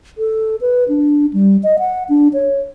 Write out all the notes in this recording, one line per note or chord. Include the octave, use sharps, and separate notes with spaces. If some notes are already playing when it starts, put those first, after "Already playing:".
A4
B4
D4
G3
D#5
F#5
D4
C#5